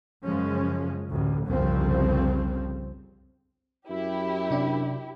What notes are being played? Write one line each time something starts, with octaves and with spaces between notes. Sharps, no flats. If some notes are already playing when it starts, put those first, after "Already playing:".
F#2 C#3 F3 G#3 C#4
A1 D2 A2
G1 C2 F2 C#3 F3 C4
F#2 E4 G4
C3 D4